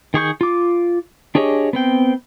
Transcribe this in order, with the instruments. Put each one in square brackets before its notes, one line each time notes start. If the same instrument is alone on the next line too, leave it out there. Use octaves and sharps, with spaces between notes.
[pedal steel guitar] D#3 G#4 C#6 G6
F4 D6
D4 G4 G#4 C#5 D#5
B3 C4 G5